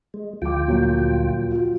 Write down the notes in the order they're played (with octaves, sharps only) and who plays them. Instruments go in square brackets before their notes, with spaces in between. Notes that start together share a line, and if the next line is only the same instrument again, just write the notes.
[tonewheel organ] G#3
[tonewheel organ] D2 F4 G5 [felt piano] F3 D6
[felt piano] A#2 F3 F#3
F4 F#4